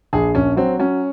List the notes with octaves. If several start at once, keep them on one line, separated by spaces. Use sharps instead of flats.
A#1 G#4
A#1 C#4
F#3 C4
F#3 C#4